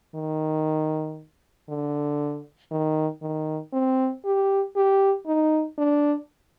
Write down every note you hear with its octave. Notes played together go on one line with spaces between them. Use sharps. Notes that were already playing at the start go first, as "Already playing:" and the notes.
D#3
D3
D#3
D#3
C4
G4
G4
D#4
D4